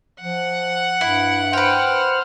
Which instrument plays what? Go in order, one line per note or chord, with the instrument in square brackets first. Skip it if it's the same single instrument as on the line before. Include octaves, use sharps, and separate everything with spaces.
[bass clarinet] F3 [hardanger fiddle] F#5
[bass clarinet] G2 [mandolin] E4
[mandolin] B4 G5 [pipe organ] C5 F6